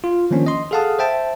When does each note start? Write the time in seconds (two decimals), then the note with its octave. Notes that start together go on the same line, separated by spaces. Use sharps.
0.04 F4
0.31 D#3 F3 A#3 C#4 D4
0.46 D#5 C6
0.71 G#4 A4 F5 F#5 A5 D#6
0.99 C5 E5 G5 A5